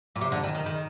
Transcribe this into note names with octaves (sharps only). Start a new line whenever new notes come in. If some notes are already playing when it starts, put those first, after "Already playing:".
A#2
C3
D3
D#3
D#3
D#3